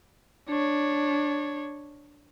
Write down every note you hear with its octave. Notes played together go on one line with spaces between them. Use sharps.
D4 C#5